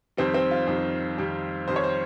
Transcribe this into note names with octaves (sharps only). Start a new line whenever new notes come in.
F2 D#3 G3 C4
C4
F4
F2 D#3 G3
F2 D#3 G3
F2 D#3 G3 C5
C#5
C5